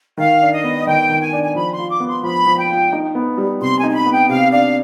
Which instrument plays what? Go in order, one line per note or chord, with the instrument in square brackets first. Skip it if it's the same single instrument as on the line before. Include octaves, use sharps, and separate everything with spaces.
[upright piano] D#3 [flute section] F5
[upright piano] D4
[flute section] D#5
[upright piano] B3
[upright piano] D#3 [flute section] G5
[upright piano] D#3
[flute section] G#5
[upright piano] D4
[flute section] G#5
[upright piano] F3 [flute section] B5
[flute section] C6
[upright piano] F4
[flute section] D6
[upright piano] B3
[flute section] C6
[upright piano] F3 [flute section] B5
[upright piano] F3
[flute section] G5
[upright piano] F4
D#4
B3
G3
[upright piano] C3 [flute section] C6
[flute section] G#5
[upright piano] D#4
[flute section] G#5
B5
[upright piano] B3
[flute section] G5
[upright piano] C3 [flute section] F5
[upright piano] D4 [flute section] F5